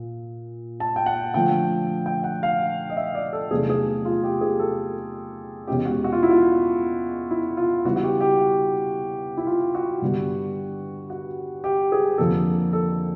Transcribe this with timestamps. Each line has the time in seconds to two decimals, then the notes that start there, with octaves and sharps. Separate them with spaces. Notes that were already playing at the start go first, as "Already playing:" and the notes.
Already playing: A#2
0.80 A5
0.96 G5
1.06 F#5
1.34 D3 F3 A3 G5
2.06 G5
2.24 F#5
2.43 F5
2.90 D#5
2.97 E5
3.15 D5
3.33 A4
3.51 E2 C3 D#3 F#3 A3 G#4
3.70 G#4
4.05 F4
4.23 G4
4.41 G#4
4.59 A4
5.67 E2 B2 G#3 C#4 G4
5.85 F#4
6.04 F#4
6.13 F4
6.23 E4
6.31 F4
7.31 E4
7.57 F4
7.85 C#3 E3 G3 B3 F#4
7.96 F#4
8.03 G4
8.21 G4
8.39 F#4
9.37 E4
9.47 F4
9.75 F#4
10.02 G2 D3 G3 B3
11.10 F#4
11.64 G4
11.92 G#4
12.18 F2 D3 F3 A#3 A4
12.73 A4